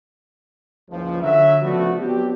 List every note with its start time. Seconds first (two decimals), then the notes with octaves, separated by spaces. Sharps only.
0.90 F#1 C#2 F3
1.23 D3 F#3 E5
1.62 C#3 F3 A3 B3 D4 F#4
1.99 F#3 B3 C4 D4 G4